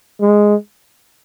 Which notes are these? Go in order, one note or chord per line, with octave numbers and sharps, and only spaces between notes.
G#3